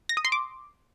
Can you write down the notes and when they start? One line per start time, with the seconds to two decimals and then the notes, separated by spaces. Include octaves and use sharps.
0.09 A#6
0.17 D#6
0.25 C6
0.32 D6